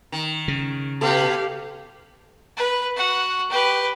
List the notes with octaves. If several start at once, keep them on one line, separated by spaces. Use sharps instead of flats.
D#3
C#3
B2 B3 G4 A4 F5
B4
F#4 F#5
G4 B4